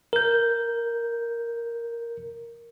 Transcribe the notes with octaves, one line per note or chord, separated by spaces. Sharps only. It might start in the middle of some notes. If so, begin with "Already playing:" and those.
A#4 G6